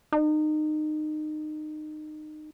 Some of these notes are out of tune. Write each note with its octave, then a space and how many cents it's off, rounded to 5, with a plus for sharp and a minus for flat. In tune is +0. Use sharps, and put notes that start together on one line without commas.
D#4 -25